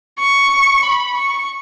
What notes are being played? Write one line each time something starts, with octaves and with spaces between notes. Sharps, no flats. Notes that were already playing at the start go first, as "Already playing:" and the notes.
C#6
B5
C#6